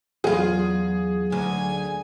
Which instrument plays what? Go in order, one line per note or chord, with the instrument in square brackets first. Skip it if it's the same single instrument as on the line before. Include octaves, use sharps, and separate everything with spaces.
[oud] E2 F4 [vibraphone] F#3 [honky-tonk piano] G#4
[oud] D2 [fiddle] G#5